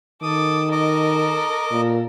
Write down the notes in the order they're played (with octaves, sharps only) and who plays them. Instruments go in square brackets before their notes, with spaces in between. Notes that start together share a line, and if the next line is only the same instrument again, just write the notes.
[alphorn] D#3 [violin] A4 D6 [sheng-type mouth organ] D#6
[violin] A4 A#4 [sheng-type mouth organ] D#5 D6
[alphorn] A#2